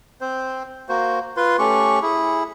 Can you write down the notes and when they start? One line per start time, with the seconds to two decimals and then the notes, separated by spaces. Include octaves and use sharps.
0.21 C4 C5
0.89 A#3 F#4 C5
1.37 F4 B4 C6
1.59 A3 C#4 G4 C#6
2.02 E4 G#4